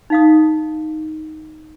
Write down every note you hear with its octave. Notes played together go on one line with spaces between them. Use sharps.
D#4 F5 D#6